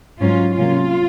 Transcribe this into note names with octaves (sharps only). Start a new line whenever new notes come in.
G#2 F#3 C#4 F4
C3 F#3 A#3 C#4 F4